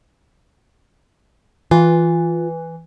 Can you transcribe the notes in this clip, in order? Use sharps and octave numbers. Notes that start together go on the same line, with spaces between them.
E3 F4